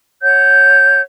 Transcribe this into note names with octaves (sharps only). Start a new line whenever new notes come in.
C#5 F#5 G6